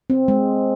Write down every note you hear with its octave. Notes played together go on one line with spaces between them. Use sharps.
C4
G#3